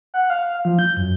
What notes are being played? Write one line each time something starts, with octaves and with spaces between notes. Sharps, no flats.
F#5
F5
F3
G6
F#2